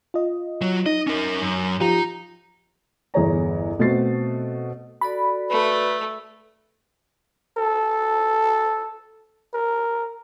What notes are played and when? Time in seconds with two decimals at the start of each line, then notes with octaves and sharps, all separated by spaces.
0.14 F4 D#5
0.62 F#3
0.86 D#4 D#5
1.07 C#4 A#4
1.42 F#2
1.81 F3 D#4 F4 G4 A#5
3.14 G1 E2 G#4 C#5 A#5
3.79 B2 A3 C4 F#4 A6 C7
5.01 F#4 A4 D5 B5
5.50 A3 B4
7.57 A4
9.54 A#4